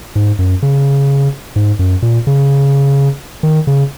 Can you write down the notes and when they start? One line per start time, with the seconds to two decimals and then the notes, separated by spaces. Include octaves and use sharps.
0.16 G#2
0.39 F#2
0.62 C#3
1.56 G#2
1.79 F#2
2.02 A#2
2.27 C#3
3.43 D#3
3.67 C#3